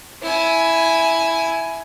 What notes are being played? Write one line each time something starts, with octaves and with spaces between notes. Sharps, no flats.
E4 G#5